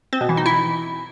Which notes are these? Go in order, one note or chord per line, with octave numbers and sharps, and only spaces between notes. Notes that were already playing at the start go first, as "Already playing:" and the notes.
C4
B2
E3
D#4
E4